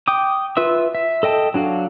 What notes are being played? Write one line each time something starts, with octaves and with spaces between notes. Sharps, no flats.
G5 D6 D#6
F4 B4 E5 E6
E5
A4 D#5 G5 A5
F#3 D4 F#4 F5